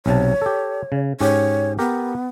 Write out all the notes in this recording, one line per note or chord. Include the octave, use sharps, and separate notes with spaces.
B1 C3 C#5 A5
G4 A4
C#3
G#2 C#4 G4 C#5
B3 G4 A#4